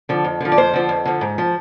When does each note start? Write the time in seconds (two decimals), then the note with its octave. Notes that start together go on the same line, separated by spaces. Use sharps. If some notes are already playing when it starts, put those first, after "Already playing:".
0.09 D3 F3
0.24 F2
0.40 D3 F3
0.52 D5
0.57 F2 C5
0.73 D3 F3
0.89 F2
1.05 D3 F3
1.21 G#2
1.38 F3